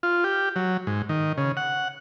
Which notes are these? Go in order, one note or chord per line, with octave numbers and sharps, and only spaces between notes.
F4
G4
F#3
G#2
D#3
C#3
F#5